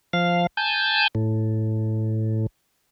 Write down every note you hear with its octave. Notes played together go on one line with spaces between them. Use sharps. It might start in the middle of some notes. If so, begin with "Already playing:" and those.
F3 F5
G#5 A5 G6
A2